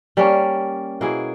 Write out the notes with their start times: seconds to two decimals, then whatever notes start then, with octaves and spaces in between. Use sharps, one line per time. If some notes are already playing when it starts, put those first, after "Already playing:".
0.17 G3 A#3 C#4
1.01 B2 A#3 E4 G#4